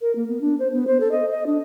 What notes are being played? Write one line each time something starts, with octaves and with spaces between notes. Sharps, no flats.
A#4
A#3
B3
D4
C5
B3
C5
A4
D#5
D#5
D4